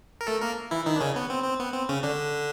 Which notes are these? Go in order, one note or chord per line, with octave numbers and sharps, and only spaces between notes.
A#4
A3 A4
A#3 A#4
E3 E4
D#3 D#4
D4
C#3 C#4
B3
C4
C4
B3
C4
C#3 C#4
D3 D4